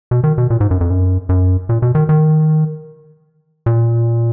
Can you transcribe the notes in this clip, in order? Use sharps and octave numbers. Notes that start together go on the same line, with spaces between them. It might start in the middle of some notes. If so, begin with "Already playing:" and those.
B2
D#3
B2
A#2
G#2
F#2
F2
F#2
F#2
A#2
B2
D#3
D#3
A#2